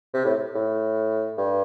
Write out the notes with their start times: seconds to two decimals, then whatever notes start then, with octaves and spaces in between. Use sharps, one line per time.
0.14 C3
0.24 A2
0.55 A2
1.38 G2